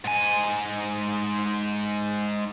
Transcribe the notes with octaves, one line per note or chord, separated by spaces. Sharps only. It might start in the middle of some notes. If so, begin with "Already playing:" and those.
G#2 G#5